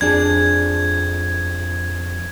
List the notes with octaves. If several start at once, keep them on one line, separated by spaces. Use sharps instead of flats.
F2 D4 G#4 G#6